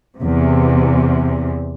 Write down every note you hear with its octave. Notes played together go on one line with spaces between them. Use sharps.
E2 C3